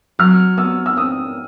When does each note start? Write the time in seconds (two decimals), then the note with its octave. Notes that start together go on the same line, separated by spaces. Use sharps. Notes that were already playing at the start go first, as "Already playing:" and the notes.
0.19 F#3 F6
0.57 B3 E6
0.86 E6
0.97 C4 D#6